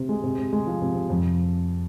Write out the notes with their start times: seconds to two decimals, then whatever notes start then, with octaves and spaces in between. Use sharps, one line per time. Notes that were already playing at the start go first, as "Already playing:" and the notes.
Already playing: C3
0.09 G#3
0.23 C3
0.38 C3
0.53 G#3
0.67 F3
0.82 C3
0.95 C3
1.10 F2